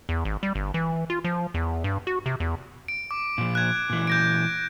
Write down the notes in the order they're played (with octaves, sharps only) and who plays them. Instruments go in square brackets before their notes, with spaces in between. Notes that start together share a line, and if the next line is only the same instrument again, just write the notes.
[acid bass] E2
G#1
G3
G1
E3
F4
F3
E2
G2
F#4
C3
E2
[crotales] D7
D6
[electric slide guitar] A#2 F3
[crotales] F#6 G#6
[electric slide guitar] A#2 E3
[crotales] G6 A#6 D7